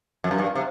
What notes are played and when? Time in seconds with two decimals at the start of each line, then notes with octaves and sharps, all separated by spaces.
0.24 F2
0.31 F#2
0.39 G2
0.55 C3